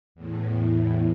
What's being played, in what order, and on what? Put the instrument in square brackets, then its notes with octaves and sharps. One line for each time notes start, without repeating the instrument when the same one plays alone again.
[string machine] E2 A2